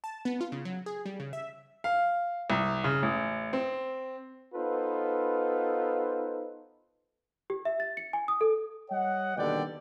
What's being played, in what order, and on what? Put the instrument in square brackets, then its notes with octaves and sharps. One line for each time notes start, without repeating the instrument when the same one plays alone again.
[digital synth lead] A5
B3
F4
C#3
F#3
G#4
G3
C#3
E5
[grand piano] F5
C2
C#3
A1
C4
[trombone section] B3 D#4 F4 A4 B4 C5
[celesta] G4
E5
A6
C#7
G#5
D#6
A4
[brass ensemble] G3 C#5 D#5 F#5
D#2 B2 D3 G3 D5 G5